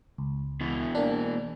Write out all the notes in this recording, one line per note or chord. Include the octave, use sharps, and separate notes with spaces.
C#2
B2 E3
A#3 D4